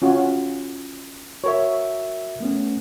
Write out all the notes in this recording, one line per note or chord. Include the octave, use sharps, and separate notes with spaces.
C#4 F4 F#4
F#4 A#4 C#5 E5
A3 B3 C#4